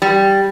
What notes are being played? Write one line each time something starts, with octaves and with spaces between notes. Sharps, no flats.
G3